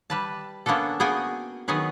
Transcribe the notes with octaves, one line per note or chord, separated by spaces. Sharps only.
G3 B4 A5
A#3 B3 C#4 D4 A4
A#3 B3 F#4 G#4 G5 G#5
D#3 F#3 B3 F#4 G#4 B4